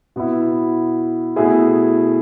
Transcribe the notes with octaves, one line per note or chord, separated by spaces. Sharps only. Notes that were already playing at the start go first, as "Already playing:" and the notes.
B2 B3 E4
B2 A3 E4 G#4